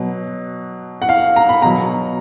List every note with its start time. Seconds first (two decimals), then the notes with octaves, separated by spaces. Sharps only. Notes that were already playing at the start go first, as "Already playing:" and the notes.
Already playing: B2 F#3
1.02 F#5
1.09 F5
1.36 A#5
1.49 B5
1.62 B2 F#3 A#5